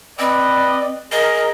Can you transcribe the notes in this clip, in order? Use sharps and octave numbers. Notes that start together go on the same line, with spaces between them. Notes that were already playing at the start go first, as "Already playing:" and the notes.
C4 B4 D5 D#5
G#4 A#4 D#5